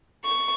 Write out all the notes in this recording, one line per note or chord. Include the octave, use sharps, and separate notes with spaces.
C#6